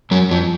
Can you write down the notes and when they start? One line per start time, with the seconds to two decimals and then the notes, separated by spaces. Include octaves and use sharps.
0.11 F#2 F#3
0.31 F2 F3